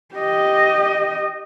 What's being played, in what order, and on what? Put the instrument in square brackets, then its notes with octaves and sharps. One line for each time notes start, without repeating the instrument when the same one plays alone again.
[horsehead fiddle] G4 D#5